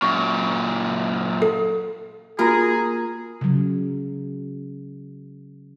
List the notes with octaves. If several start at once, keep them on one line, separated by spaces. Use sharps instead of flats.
F#2 A#2 C#6
A4
A#3 F4 F#4 G#4 A#4 A#5
C#3 F#3